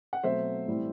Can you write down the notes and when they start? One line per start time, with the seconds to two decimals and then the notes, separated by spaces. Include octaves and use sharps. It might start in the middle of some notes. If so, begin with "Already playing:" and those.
0.13 F#5
0.23 B2 F#3 A3 C4 C5 E5
0.67 A2 E3 G3 C4